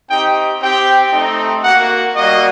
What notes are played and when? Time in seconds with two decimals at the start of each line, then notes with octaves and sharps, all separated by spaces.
0.10 C4 D#4 G4 G5
0.61 C4 G4 G5
1.13 A3 C4 D#4
1.64 A#3 F#4 F#5
2.16 G3 A#3 F#4 D#5